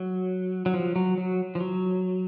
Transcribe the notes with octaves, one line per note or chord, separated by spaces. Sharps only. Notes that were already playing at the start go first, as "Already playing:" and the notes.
Already playing: F#3
F#3
F3
F#3
F#3
F3
F#3